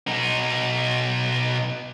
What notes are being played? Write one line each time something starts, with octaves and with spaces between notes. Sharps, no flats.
B2 D#4